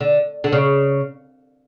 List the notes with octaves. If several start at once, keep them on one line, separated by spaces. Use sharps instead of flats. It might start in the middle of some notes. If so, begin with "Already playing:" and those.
D3
D3
C#3